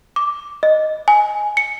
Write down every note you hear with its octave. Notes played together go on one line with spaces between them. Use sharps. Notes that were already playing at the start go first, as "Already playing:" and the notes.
D6
D#5
G#5
C#7